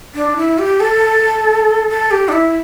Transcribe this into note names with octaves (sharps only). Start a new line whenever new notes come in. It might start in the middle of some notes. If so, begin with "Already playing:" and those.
D4
E4
G4
A4
A4
G4
D4
E4